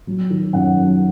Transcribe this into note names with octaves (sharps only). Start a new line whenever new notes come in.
F#3
D#3
F#2 F#5
F#2